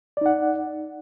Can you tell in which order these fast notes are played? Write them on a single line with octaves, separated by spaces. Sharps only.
D5 D#4 F#5